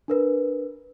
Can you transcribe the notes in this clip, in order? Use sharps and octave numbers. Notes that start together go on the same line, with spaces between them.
D4 A#4 B4